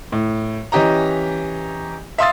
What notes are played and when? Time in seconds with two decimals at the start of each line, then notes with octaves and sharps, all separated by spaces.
0.12 A2
0.72 E3 C#4 G4 D#5 A#5
2.18 E5 F5 C6 D#6 E6 A6